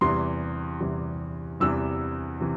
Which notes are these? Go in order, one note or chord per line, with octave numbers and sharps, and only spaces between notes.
E2 C3 E3 G3 C6
E2 C3 E3 G3
E2 C3 E3 G3 E6
C3 E3